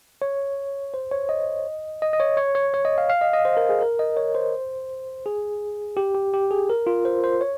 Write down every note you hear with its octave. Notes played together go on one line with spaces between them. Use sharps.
C#5
C5
C#5
D#5
D#5
D#5
C#5
C#5
C#5
C#5
D#5
F5
F5
D#5
D#5
C5
A#4
G#4
A#4
D#5
C#5
C5
G#4
G4
G4
G4
G#4
A#4
F4
C5
C5
C#5